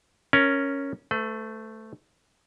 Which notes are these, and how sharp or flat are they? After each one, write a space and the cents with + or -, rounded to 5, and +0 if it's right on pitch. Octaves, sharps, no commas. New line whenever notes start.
C#4 +0 A#4 +0
A3 +0 B4 +45